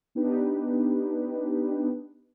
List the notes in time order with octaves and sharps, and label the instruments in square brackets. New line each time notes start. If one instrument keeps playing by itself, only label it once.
[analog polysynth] B3 D4 D#4 G4 B4